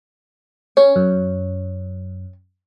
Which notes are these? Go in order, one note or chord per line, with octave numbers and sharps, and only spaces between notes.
C#4 C#5
F#2